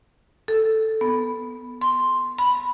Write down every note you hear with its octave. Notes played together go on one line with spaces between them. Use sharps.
A4
B3
C6
B5